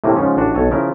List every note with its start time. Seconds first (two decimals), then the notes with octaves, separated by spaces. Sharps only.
0.04 A2 C3 E3 A#3
0.16 G#2 C#3 F3 C#4
0.37 A1 D4 F#4
0.55 B1 A4 C#5 G#5
0.71 C#3 F3 E4 A#4